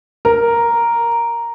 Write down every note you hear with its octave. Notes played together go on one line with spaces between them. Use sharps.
A#4